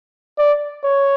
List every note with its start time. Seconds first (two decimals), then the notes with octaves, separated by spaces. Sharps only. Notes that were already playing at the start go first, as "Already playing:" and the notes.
0.38 D5
0.84 C#5